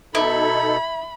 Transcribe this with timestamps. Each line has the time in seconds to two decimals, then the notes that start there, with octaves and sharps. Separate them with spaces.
0.15 B2 D#4 E4 A4 B5